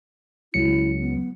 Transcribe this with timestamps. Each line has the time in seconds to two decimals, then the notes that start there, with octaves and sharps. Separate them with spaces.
0.54 C#2 F#3 E4 C#7
1.00 B3